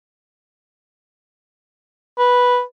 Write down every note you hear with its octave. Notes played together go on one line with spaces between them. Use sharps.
B4